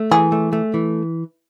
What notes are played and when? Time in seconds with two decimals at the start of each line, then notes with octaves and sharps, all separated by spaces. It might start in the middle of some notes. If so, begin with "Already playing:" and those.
Already playing: A3
0.11 E3 G#4
0.32 A3
0.53 A3
0.74 E3